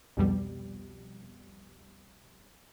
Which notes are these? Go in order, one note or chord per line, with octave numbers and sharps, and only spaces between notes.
C2 F2 B2 G3